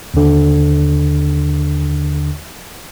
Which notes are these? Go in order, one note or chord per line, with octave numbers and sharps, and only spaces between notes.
D#2 D3